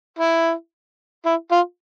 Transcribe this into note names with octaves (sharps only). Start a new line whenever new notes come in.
E4
E4
F4